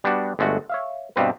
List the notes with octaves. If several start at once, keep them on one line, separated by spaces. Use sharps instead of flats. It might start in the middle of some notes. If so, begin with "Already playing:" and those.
G3 B3 D4 F#4
G1 G#3 A3 F#4
C#5 E5 F5
G2 B2 G3 C4 B4